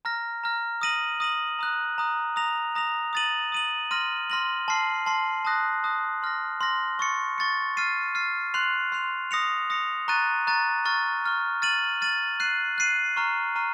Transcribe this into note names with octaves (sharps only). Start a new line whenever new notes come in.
A#5 F6 A#6
A#5 F6 A#6
D#6 A#6 D#7 F#7
D#6 A#6 D#7 F#7
A#5 D#6 F#6
A#5 D#6 F#6
A#5 D#6 A#6 F7
A#5 D#6 A#6 F7
D#6 A6 D#7 F#7
D#6 A6 D#7 F#7
C6 F6 A#6 D#7 F#7
C6 F6 A#6 D#7 F#7
A5 C6 F6 C7
A5 C6 F6 C7
A5 D#6 F#6 A#6
A5 D#6 F#6 A#6
C6 F6 A#6
C6 F6 A#6
C#6 A6 C#7
C#6 A6 C#7
F6 A6 C7 D#7
F6 A6 C7 D#7
C6 F#6 C7 F7
C6 F#6 C7 F7
D#6 A#6 C#7 F7
D#6 A#6 C#7 F7
A#5 C#6 F#6 A6 D#7
A#5 C#6 F#6 A6 D#7
C#6 F6 A6
C#6 F6 A6
F6 A6 D#7 F#7
F6 A6 D#7 F#7
F#6 C7 D#7 F#7
F#6 C7 D#7 F#7
A#5 C#6 F6 C7 D#7
A#5 C#6 F6 C7 D#7